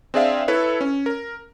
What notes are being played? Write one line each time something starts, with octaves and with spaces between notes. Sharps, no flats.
C4 D4 G#4 D5 E5 F5
E4 A4 B4 C#5
C#4
A#4